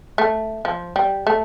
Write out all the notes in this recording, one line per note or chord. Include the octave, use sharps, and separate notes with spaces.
A3
F3
G3
A3